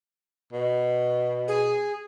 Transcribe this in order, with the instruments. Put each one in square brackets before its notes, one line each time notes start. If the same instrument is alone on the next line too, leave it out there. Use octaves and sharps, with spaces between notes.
[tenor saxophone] B2
[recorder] G#4